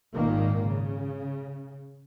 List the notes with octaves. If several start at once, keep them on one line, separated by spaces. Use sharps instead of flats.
G#1 A#2 D#3 A#3
C#3